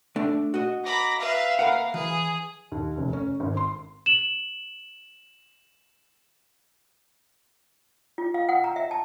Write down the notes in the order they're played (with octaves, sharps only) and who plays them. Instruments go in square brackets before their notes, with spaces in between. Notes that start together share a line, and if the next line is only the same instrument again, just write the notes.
[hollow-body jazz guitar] A3 D4
F#4 D#5
[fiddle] A#5 B5 [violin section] D6 A#6
[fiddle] B4 E5 [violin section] F5
[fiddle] A#3 [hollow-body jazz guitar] A#4 B4 F#5
[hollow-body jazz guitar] E3 [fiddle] G#4
[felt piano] D#2
F1
C#4
G#1
C6
[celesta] E7 F#7
[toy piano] F4
F5
F#5
A#5
E5
A5